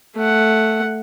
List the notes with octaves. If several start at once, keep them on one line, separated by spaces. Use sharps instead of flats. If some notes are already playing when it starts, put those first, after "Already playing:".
A3 F#5